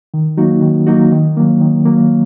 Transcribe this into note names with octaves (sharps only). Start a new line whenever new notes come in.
D#3
F#3 A#3 D#4 F#4
D#3
F#3 A#3 D#4 F#4
D#3
F#3 A#3
D#3
F#3 A#3